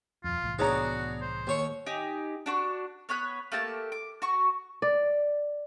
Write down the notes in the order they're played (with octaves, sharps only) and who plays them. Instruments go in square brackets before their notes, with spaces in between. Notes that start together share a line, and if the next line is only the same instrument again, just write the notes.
[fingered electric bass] D#1 F2 [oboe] F4
[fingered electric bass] C2 A2 E3
[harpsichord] B3 D4 [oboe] F#4 [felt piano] G#4 C#5 A#5
[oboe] C5
[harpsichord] D#2 C#5 C#6
[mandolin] D#4 G4 G#5
D4 F#4 C#6
B3 C#5 B5 F#6
A3 A#3 G4 A5
D6
F#4 C#6
[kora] D5